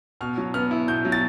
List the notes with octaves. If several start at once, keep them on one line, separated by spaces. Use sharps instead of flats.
B2 F6
F#3
B3 F6
E4
B2 G6
F#3
A6